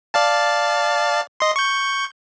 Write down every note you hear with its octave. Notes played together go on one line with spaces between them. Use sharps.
D5 F5 A5
D#5 C6
C#6 G6